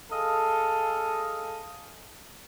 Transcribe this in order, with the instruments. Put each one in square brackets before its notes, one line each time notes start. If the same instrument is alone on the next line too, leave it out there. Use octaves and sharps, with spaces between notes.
[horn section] G#4 A4 D#5 F5